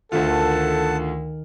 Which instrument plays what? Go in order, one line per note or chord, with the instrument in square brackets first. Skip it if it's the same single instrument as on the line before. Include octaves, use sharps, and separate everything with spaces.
[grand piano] D2 A3 F4 [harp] D#3 [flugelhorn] A4 [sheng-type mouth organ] F#5 A5